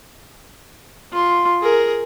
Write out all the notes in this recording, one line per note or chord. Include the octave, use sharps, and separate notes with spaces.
F4 C6
G#4 A#4